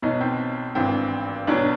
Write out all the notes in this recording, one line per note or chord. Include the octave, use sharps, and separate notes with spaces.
B1 B2 F#3 D#4
C4
G#1 G2 E3 C4
B1 B2 F#3 D4